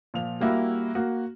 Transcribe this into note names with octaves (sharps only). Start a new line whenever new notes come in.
A#2 F3 F7
G3 A#3 E4 F#4
A#3 F#4